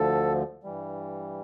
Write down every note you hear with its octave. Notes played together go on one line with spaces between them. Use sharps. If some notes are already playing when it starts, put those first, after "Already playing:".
Already playing: D2 D3 F3 A4
G2 E3 G3